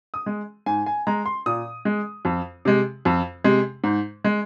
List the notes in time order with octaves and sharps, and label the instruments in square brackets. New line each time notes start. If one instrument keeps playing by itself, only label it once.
[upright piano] D#6
G#3
G#2 G#5
G#5
G#3 A#5
C6
A#2 D#6
G#3
F2
C3 G#3
F2
C3 G#3
G#2
G#3